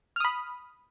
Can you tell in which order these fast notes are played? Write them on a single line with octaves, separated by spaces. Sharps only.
F6 D#6 B5